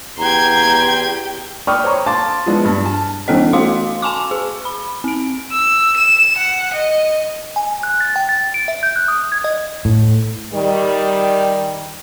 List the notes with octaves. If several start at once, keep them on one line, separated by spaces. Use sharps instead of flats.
E2 G4 G5 A#5 C6 G#6
D5 G5 B5 C#6 D#6 F6
C5 C#5 A#5 C#6 D#6
F5 A5 C6 D6 A6
F3 G#3 B3 D4 E4
G2
A5
E3 B3 C#4 A4 D#5
A3 F#4 F5 C6
G#5 A5 C#6 D6
G#4
B5
C4 D7
E6
E7
F#5
D#5
G#5
F#6
A6
G5
A6
D7
E5
G6
F#6
D#6
G#6
D#5
A2
D#3 G3